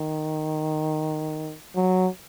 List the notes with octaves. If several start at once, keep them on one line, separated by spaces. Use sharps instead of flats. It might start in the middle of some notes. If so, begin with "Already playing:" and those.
Already playing: D#3
F#3